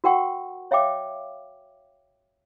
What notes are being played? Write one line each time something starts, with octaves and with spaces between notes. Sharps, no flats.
F#4 A#4 F#5 G5 C#6
C#5 E5 F5 G5 D6